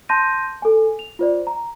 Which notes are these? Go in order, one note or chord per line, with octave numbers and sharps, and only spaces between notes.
A5 C6 G6 A#6 D#7
A4 G#5
F7
F4 C5 D5
A#5